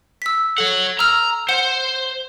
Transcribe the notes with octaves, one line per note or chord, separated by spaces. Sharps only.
E6 B6
A4 C#5 F#5
A#5 E6 F6
C5 F#5 C#7 E7